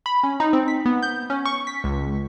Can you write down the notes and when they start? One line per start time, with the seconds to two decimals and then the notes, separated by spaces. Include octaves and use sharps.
0.06 B5
0.23 C#4
0.40 D#4
0.53 C4
0.68 B6
0.86 B3
1.03 G6
1.30 C#4
1.45 C#6
1.67 B6
1.84 C#2